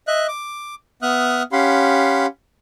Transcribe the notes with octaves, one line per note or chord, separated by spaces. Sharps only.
D#5 E5 F#6
D6
B3 E5 D#6 F6 F#6
C#4 G4 F5 F#5 B5 C6